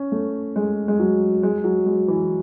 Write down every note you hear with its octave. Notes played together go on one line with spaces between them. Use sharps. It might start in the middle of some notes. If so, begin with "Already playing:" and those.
Already playing: C#4
A3
G#3
G#3
F#3
G#3
F#3
G#3
E3